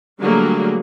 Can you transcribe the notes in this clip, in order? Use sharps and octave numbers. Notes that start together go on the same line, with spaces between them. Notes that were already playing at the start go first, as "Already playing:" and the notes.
D3 F#3 G3 A3 A#3 G#4